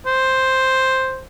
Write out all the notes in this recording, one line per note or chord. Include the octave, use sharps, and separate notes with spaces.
C5